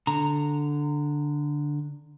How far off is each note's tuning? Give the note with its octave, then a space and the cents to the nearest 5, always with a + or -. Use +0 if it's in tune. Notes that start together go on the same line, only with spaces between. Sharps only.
D3 +0 A#5 -15